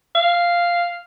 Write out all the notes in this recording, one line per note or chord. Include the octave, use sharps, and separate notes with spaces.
F5